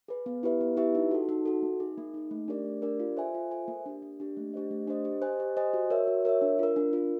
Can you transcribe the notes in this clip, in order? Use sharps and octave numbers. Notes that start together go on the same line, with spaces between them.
G#4 B4
B3
E4 G4 B4 E5
B3
E4 G4 B4 E5
D#4
F#4 A4
D#4
F#4 A4
A#3
D#4 G#4
A#3
D#4 G#4
A3
D4 G4 A#4 D5
A3
D4 G4 A#4 D5
F4
A4 C5 E5 G#5
F4
A4 C5 E5 G#5
A#3
D4 G4
A#3
D4 G4
A3
D4 G4 C5 D#5
A3
D4 G4 C5 D#5
G4
C5 D#5 G#5
G4
C5 D#5 G#5
F#4
A#4 C#5 E5
F#4
A#4 C#5 E5
D4
F4 A#4
D4
F4 A#4